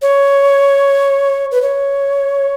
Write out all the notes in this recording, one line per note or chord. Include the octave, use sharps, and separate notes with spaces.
C#5
B4
C#5